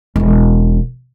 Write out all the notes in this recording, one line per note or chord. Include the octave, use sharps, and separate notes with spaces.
E1 C#4